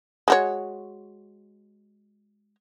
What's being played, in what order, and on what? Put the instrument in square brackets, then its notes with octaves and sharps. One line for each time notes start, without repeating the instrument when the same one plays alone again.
[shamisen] G#3 F#4 C#5